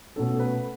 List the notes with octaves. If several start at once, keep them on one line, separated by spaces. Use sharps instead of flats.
B2 A3 C#4 A4
B4